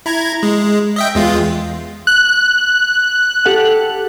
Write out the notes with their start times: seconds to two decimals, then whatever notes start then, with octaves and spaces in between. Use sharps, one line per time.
0.06 E4 A#5 G#6
0.43 G#3
0.96 D#5 E5 G5
1.15 E2 G#3 F4
2.07 F#6
3.46 G4 A4 F#5